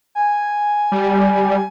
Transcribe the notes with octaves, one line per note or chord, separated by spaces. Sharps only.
G#5
G3